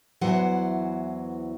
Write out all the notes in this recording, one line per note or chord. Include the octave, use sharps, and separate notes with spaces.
E2 E3 F#3 C5 F#5